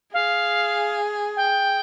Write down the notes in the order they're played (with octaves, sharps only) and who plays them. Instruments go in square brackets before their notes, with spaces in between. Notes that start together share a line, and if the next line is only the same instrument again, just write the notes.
[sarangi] G#4 [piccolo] F5
[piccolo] G5